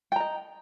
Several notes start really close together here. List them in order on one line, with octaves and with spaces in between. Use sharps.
G5 A#5 D#5